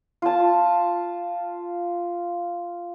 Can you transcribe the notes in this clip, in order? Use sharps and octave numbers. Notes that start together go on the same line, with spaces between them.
F4 A5